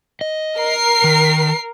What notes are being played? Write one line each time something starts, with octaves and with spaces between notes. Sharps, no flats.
D#5
A#4 C7
D#3